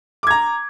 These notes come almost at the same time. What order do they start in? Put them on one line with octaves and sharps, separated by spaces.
D6 G#6 A#5